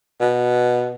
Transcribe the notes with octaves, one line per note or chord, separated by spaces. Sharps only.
B2